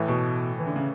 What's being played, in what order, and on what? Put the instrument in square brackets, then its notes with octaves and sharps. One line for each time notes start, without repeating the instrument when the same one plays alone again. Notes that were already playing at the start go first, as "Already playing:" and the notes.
Already playing: [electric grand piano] A2 E3 A3
[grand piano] B2
E3
D3
C#3